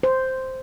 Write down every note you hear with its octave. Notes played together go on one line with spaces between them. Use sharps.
C5